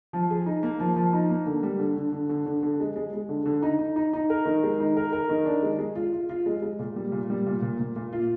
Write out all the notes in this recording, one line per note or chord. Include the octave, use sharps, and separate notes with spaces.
F3
G#4
D#4
A#3
F3
F3
D#4
A#3
D3
G3
D3
D3
D3
D3
D3
D3
G#3
G#3
G#3
D3
D3
D#4
D#4
D#4
D#4
A#4
D#3
G#3
D#4
A#4
A#4
D#3
D4
G#3
G#3
F4
F4
F4
G#3
G#3
A#2
G3
A#2
G3
A#2
A#2
A#2
A#2
F4